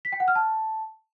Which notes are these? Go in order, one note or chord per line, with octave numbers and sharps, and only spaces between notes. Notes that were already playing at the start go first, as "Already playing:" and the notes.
B6
G5
F#5
F6
A5